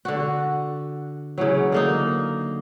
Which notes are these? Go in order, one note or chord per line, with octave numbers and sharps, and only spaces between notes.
D3 F#4
C#3 E3 F#3
D3 A#3 D#4